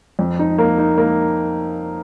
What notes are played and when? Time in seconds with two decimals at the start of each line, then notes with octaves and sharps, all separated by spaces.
0.19 F2
0.39 D#4
0.58 A#3
0.78 D#4
0.98 A#3